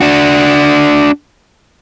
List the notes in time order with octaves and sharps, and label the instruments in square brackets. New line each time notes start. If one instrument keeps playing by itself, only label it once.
[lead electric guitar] D4 F#4